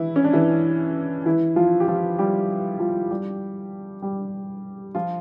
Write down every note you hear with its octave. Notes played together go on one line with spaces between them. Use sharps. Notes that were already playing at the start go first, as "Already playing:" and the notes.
Already playing: E3 E4
C#4
D4
E3 E4
E3 E4
F3 F4
G4
F3 F4
G3 G4
F3 F4
G3 G4
G3 G4
F3 F4